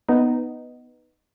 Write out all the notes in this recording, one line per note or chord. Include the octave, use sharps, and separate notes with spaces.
B3 D#4